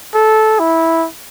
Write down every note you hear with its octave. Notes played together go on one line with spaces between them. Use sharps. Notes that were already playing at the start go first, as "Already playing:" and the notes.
A4
E4